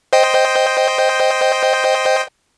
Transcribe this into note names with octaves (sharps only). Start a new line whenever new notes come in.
C5 D#5 G5